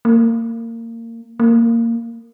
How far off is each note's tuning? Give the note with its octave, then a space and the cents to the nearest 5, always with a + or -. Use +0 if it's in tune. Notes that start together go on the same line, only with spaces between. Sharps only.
A#3 -25
A#3 -15